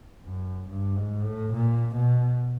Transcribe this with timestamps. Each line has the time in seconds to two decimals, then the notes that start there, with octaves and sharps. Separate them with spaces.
0.25 F#2
0.68 G2
0.96 G#2
1.24 A2
1.53 A#2
1.95 B2